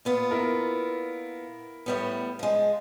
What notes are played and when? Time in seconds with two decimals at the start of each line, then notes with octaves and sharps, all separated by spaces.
0.05 A#2 B3 F4
0.31 E4 A#4
1.86 A2 G3 B3
2.39 F3 G#3